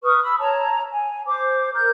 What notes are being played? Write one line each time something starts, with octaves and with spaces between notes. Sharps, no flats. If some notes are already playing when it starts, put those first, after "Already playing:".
B4 C#6 D#6 F6
B5 E6
C#5 A5 A#5
G#5
C5 D6
A#4 G6